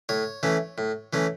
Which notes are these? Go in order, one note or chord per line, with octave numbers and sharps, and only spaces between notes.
A2 C#5
E3 A3 C#4
A2
E3 A3 C#4